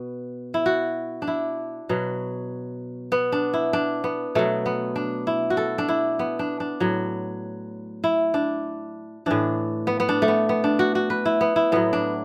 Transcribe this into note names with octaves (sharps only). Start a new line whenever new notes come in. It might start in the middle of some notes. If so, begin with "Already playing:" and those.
Already playing: B2 B4
E4
F#4
D4
E4
B2 F#3
B3
D4
E4
D4
B3
B2 F#3 A3
B3
D4
E4
F#4
A4
D4
E4
B3
D4
D4
A2 F#3
E4
D4
A2 E3 D4
B3
B3
D4
A3
B3
B3
D4
F#4
F#4
B4
E4
B3
E4
A2 F#3 B3
D4